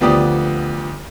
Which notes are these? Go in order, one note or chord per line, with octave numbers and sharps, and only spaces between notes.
D2 F3 B3 G4 D5 D#6